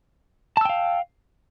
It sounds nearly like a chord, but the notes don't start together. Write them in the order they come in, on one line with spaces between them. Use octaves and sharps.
A5 E6 G5 F5